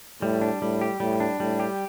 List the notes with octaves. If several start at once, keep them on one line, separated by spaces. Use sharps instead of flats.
A2 G3
D4
A2 G3
G4
A2 G3
D4
A2 G3
G4